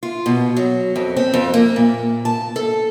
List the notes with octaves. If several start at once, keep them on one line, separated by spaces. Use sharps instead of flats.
F4
B2
F#3
F2
C4
F2
A#3
A#2
A5
A4